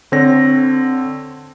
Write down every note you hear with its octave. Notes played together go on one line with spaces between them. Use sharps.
D3 C4 C#5 A#6